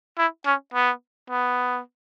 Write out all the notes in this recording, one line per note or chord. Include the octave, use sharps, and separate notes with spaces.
E4
C#4
B3
B3